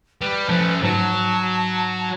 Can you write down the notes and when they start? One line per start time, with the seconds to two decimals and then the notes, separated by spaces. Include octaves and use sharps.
0.21 G3 B4
0.49 F3 A3 C#4
0.83 G#2 F#3 A5